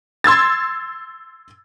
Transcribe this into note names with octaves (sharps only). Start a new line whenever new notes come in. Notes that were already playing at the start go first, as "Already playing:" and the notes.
C6 E6 G#6 A6